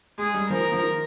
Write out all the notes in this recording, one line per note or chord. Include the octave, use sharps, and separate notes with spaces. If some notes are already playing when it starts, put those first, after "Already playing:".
G#3 G#4
G3
F3 A#4
D#3
F3
D#3